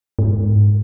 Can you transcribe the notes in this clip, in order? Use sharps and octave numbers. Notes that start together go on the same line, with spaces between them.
G#2